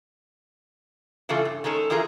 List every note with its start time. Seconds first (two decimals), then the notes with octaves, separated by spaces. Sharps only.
1.29 C#3 E3 A3 F4 A4
1.45 G2
1.64 D#3 G#3 C#4 A4
1.90 E2 E3 F4 G#4 A#4